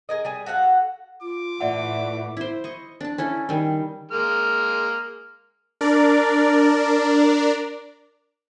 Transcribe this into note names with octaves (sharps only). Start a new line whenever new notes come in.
G#4 A#4 D#5
G3 G#4 G#5
F#4 A4 F5 F#5
F4 D6
A2 E3 A3 D5 E5 F#5
E4 C5
D#5 C#6
D4 A5
C#4 E4 A4
D#3 G3
G#3 A#3 F6
D4 A#4 D5